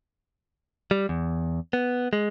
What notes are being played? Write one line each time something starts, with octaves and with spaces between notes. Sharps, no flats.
G3
E2
B3
G#3